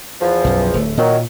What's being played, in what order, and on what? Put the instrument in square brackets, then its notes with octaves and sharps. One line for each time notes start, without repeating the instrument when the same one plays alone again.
[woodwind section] E2 F3
[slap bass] B1 F#2
D1 A3
[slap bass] A#2 [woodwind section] D#3 F#3